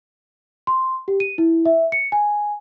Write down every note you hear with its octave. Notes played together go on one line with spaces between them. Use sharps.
C6
G4
D#7
E4
E5
C#7
G#5